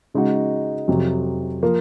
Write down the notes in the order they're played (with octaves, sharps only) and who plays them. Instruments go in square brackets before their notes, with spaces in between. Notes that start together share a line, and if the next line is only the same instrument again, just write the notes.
[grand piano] C#3 G#3 D#4 F#4
F2 C3 F#3
F3 A#3